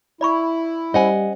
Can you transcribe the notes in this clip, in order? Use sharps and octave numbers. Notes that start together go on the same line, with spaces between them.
E4 D5 B5 C#6
G3 C#4 C5 D#5 F#5 G#5